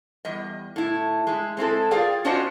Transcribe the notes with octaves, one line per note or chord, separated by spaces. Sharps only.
E2 G3 D#5
A2 E4
G#3 E4
G#3 C4 E4 A4
F4 G#4 A#4 D5 F5 G5
C#4 D4 F4 F#4 C5 D#5